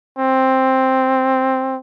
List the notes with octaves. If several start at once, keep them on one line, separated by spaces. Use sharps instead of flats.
C4